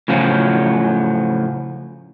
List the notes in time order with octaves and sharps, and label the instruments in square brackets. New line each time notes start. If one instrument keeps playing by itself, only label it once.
[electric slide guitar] A2 C#3 F3 F#3